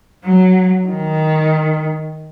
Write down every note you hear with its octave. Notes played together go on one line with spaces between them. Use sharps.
F#3
D#3